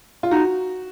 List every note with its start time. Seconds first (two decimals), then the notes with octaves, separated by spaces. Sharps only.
0.23 F4
0.31 D#4 F#4